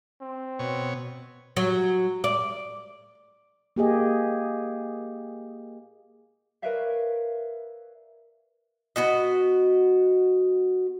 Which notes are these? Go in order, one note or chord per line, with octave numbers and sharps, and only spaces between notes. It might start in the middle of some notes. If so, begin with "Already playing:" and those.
C4
B2 C#5
F#3
D5
A#3 G4 G#4 D#5
A#4 B4 C#5 D5 E5 F5
B3 F#4 D#5